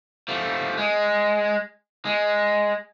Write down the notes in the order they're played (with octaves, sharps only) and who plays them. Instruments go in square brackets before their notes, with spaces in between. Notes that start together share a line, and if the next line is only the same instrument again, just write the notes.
[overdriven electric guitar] F3 A3
G#3
G#3